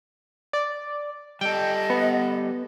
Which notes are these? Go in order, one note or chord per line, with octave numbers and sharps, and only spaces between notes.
D5
G3 A4 D#5 G5
B3